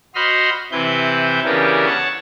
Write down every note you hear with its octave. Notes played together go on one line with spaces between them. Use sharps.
F#4 C5 D#5 B5 C6 F6
C3 E3 E4 B4 G6
C#3 E3 B3 D4 G4 A#4
C#5 F#5 A5